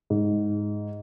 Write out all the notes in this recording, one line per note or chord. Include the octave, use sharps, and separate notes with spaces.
G#2